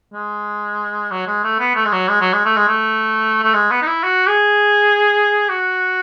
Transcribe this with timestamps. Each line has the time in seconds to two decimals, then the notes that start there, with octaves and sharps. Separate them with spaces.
0.13 G#3
1.11 F#3
1.27 G#3
1.44 A3
1.60 B3
1.76 A3
1.86 G#3
1.92 F#3
2.09 G#3
2.21 F#3
2.33 G#3
2.45 A3
2.57 G#3
2.68 A3
3.43 A3
3.54 G#3
3.71 B3
3.82 D#4
3.87 E4
4.03 F#4
4.28 G#4
5.49 F#4